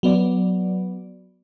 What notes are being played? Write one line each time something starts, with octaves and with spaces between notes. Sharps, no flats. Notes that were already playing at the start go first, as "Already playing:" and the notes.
F#3 B3 D5